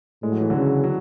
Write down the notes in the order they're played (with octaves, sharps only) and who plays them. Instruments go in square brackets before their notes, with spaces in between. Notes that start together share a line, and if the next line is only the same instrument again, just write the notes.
[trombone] A2 [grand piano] G#3
[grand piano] F#3
E3
D3 F#3
[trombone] C#3
[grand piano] F#3